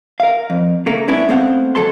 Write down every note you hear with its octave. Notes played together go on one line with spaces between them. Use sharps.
A#4 F5
F2
C#3 A3 A#3
G2 B3 C#4 D4 E4
A3 B3 C4 C5 F5 F#5
D#2 F#3 A4 A5 C6